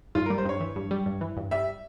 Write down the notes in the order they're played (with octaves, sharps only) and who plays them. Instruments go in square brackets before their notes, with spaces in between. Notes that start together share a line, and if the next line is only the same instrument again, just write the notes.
[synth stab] G2 [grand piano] F4
[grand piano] A#4
[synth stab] G3
[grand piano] C5
[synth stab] G2 [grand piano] C#5
[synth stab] E3
G2
G3
G2
E3
G2
[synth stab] G3 [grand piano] E5